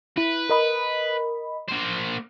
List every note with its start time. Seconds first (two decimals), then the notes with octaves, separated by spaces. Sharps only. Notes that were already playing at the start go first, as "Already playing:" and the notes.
0.18 E4 B4
0.49 A#4 D#5 B5
1.68 A#3 C5